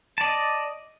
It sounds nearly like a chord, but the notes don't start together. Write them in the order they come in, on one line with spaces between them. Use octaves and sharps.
A5 D5 D#5